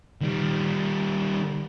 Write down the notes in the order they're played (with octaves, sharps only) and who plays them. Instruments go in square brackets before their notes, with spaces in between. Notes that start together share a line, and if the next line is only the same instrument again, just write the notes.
[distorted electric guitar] D#3 G3